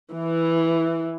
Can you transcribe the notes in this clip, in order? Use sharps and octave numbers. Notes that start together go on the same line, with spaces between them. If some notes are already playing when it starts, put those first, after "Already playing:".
E3